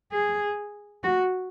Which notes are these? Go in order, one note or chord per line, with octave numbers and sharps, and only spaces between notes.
G#4
F#4